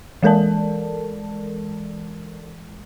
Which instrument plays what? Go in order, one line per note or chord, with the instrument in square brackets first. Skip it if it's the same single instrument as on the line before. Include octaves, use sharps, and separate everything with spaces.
[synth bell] E3 G#3 A4 A#4 D5 A5